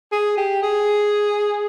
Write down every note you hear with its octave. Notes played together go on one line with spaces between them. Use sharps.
G#4
G4
G#4